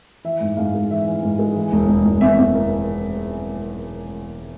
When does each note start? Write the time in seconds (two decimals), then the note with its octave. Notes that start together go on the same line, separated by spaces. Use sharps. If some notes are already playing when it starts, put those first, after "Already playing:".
0.24 E3 E5
0.41 G#2
0.57 G#2 F5
0.74 G#3
0.91 E3 E5
1.07 E3
1.23 G#2
1.39 G#3
1.55 E3
1.73 E1
1.88 E1
2.05 E1
2.21 E2 E5
2.38 E2
2.54 A#3